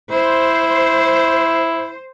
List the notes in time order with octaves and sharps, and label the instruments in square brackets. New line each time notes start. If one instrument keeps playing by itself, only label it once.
[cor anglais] E4 [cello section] C5